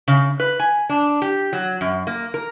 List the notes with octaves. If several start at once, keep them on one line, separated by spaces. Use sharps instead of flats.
C#3
B4
G#5
D4
G4
F#3
F#2
A#3
A#4